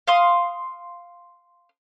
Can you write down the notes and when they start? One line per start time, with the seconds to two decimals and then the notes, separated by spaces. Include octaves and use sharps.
0.07 F5 C6 D#6